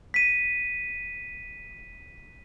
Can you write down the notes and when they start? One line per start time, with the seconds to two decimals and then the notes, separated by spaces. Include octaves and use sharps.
0.14 B6 D#7